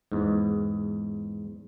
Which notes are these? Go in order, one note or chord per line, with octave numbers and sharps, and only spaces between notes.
E2 G#2